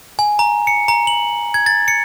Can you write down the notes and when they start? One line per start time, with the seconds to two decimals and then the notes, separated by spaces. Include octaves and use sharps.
0.19 G#5
0.39 A#5
0.67 C#7
0.88 A#5
1.07 F#7
1.54 G#6
1.66 A6
1.88 C#7